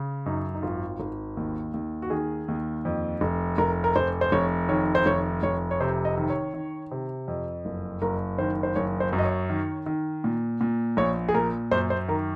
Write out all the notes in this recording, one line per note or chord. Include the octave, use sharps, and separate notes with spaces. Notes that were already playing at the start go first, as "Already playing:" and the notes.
Already playing: C#3
F#2 D#4
D#4
G#1 F4
G#1
D#2
D#2
F#4
D#3 G#4
D#2
F2
F1
F1 A#4
A#4
F1 C5
C5
F1 C#5
D#3 C#5
C5
F1 C#5
F1 C#5
C#5
C3 C5
D#5
D#3
C#5
D#3
C3
F2
F#1
F#1 A#4
D#3 C5
C5
F#1 C#5
C5
F#2
D#5
C#5
D#3
D#3
A#2
A#2
A#1 C#5
G#4
A#2 A#4
F#2 C5
C5
D#3 A#4